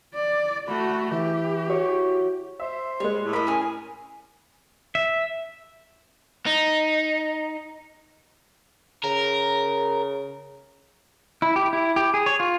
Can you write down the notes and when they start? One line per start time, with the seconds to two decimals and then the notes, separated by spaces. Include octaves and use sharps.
0.15 D5
0.68 A3 F#4 B5
1.11 E3 G4
1.68 F#4 C#5
2.60 C5 E5
3.00 G3 G#3 C#5
3.20 A2
3.33 A#4 D#5 B5
3.47 C#4 G#4
4.95 E5
6.46 D#4
9.04 C#3 A#4
11.42 E4
11.56 G4
11.73 E4
11.96 G4
12.14 G#4
12.26 C#5
12.40 F4